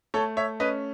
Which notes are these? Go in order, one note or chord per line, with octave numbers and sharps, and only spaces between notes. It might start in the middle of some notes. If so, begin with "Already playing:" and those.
A3 A4 C#5
C#5 E5
C#4 B4 D#5